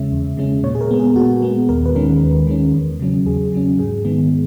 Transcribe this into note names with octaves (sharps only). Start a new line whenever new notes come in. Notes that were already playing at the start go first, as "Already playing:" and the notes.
Already playing: E2 C#3 G#3 C#4 E5
E2
C#3 G#3 C#4
A#2 C#5
G#4
A#4
G#3 B3
G#4
A#2 F#4
G#3 B3
D#2 A#4
B4
D#3 G#3 C#4 A#4
D#2
D#3 G#3 C#4
E2
C#3 F#3 C#4
E2 G#4
C#3 F#3 C#4
G#2 G#4
D#3 G#3 B3